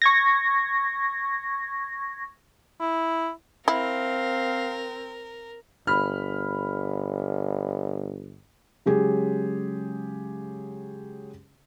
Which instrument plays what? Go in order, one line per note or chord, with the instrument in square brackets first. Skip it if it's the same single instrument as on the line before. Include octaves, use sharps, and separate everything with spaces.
[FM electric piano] C#6 G#6 A#6
[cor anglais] E4
[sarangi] C4 [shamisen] E4 [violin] A#4 [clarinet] F5
[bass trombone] G1 [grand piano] B5 F6
[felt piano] C#3 F#3 G#3 G4 G#4